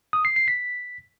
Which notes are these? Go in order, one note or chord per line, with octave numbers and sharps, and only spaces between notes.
D#6
C7
C7
B6